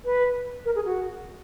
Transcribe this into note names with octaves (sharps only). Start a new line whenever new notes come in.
B4
A#4
G#4
F#4